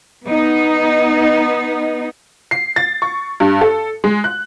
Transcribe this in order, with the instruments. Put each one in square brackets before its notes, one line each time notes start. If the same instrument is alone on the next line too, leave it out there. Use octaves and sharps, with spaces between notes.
[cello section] B3 D#4
[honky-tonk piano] C7
A6
C#6
G2
A4
G#3
F#6